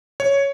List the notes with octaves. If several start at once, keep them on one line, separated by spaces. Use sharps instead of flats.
C#5